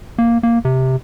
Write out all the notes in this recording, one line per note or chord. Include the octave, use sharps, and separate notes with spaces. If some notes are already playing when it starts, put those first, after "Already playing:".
A#3
A#3
C3